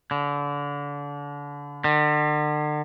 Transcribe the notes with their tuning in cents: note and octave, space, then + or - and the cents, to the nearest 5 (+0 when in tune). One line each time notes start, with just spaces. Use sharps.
D3 -30
D3 +40